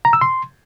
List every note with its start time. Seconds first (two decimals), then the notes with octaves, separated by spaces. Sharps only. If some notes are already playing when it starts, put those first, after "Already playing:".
0.05 A#5
0.13 E6
0.21 C6